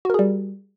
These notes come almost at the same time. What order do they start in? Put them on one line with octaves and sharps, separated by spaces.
F#4 A#4 G#4 G3